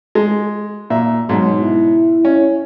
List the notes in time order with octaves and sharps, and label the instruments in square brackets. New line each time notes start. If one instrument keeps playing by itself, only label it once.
[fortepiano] G#3
A#2 E5
[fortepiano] G#2 B2 [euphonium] F#3
[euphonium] E4
[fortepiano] C#4